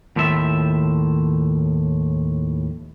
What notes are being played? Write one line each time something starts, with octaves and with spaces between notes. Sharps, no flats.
D#2 A2 F3 E5